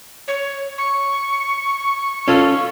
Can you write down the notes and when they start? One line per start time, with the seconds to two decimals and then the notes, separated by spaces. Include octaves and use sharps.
0.28 C#5
0.78 C#6
2.28 C#4 F4 A4